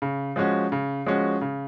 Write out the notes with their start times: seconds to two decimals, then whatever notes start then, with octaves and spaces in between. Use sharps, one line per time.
0.02 C#3
0.36 F3 G#3 C#4 F#4
0.72 C#3
1.06 F3 G#3 C#4 F#4
1.41 C#3